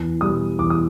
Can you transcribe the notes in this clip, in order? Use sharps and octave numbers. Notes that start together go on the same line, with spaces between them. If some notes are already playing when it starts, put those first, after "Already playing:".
Already playing: E2
B2 G3 D#6
E2 D6
D#6